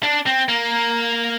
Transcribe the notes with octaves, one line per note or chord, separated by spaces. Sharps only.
D4
C4
A#3